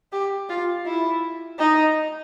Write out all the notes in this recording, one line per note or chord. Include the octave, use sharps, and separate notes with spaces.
G4
F4
E4
D#4